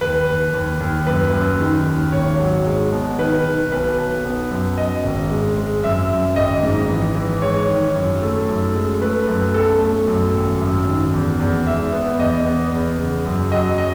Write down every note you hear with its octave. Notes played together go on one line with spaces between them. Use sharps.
D#2 B4
D#2
D#2
D#2
F#2 B4
F#2
D#3
D#2
G#1 C#5
F#3
G#3
B2
D#3 B4
D#3
B1 B4
B1
B3
F#2
F#2 D#5
G#1
G#3
G#3
F#2 E5
F#2
G#1 D#5
G#2
E3
E3
G#3 C#5
D#3
F#2
A3
F#2
G#3
A3 B4
F#2
B1 A4
A3
F#2
G#1
F#2
D#3
E2
E2
G#3 E5
B3
E2 D#5
B3
E2
C#3
F#2
F#3 D#5
D#5